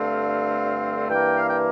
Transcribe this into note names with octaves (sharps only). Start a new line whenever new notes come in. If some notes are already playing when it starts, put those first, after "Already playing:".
Already playing: G2 D3 A3 C4 F5
G2 E3 A#3 G5
F5
G5